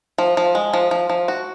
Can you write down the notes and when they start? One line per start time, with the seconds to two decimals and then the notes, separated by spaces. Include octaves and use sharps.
0.18 F3
0.37 F3
0.55 G#3
0.74 F3
0.91 F3
1.10 F3
1.28 F#4